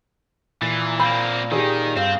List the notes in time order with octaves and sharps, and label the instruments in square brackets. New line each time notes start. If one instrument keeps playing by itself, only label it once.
[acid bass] A#2 [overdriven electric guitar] E3 [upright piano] A6 C7
[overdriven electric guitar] A#3 C4 [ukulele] B5 [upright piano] E6
[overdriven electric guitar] D#3 [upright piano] G4 G#4
[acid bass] G2 [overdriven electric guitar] C4 [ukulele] F5